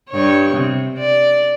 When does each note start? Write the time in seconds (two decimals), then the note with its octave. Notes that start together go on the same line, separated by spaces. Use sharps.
0.10 G2 C#5
0.56 C3
0.99 D5